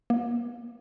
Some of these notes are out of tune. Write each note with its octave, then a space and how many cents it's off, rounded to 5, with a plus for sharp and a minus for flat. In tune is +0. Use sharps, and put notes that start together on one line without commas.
A#3 +45